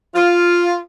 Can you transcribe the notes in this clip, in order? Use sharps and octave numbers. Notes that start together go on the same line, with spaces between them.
F4